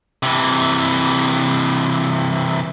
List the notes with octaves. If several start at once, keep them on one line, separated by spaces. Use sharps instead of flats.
C3 E3